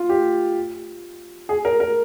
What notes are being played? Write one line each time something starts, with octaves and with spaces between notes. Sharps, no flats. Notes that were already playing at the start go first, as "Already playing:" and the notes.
Already playing: F4
G4
G#4
A#4
A#4